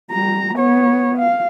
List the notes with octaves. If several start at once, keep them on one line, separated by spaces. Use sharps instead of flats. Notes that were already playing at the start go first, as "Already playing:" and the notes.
G3 A#5
B3 C#5
F5